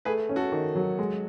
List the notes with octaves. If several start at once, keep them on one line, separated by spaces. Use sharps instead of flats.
A3 G#4 B4
C#4
F#4 A4
D#3
F#3
G#3